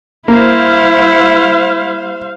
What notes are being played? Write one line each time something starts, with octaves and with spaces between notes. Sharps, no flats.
G3 A#3 E4 C5 F5